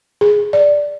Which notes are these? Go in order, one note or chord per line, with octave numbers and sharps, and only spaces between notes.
G#4
D5